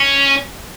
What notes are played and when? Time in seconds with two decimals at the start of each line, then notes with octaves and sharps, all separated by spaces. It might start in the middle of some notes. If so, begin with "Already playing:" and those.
Already playing: C#4